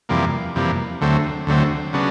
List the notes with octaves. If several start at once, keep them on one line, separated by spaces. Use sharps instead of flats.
F2 C3 E3 G3 A#3
F2 C3 E3 G3 A#3
D2 D3 F#3 A3 C4
D2 D3 F#3 A3 C4
C#3 F#3 B3 D4